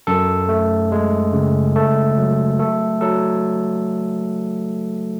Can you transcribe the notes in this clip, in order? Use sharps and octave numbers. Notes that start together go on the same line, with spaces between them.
F#2 A4
A3
G#3
C#3
A3 A4
F#3
A3 A4
F#3 A4